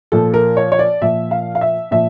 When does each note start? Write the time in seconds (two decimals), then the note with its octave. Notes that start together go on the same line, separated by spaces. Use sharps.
0.12 A#2 F3 A4
0.34 A#4
0.57 C#5
0.72 C#5
0.79 D5
1.01 A#2 F3 E5
1.31 F5
1.55 F5
1.61 E5
1.91 A#2 F3 E5